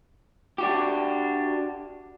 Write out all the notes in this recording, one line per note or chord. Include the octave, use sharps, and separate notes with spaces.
D4 F#4 G4